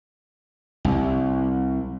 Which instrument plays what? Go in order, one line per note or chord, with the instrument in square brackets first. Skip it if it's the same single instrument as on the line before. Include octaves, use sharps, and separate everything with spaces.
[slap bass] C2